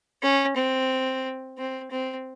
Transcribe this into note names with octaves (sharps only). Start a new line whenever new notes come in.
C#4
C4
C4
C4